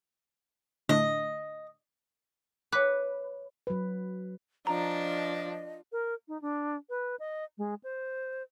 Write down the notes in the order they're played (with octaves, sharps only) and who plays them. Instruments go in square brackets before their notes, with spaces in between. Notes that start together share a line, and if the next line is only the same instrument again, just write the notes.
[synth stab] A2 D3 [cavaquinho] D#5
[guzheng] B4 [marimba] C#5 D6
[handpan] F#3 B4
[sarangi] F3 [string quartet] D4 [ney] D#5 [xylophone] A#5
[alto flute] A#4
D#4
D4
B4
D#5
G#3
C5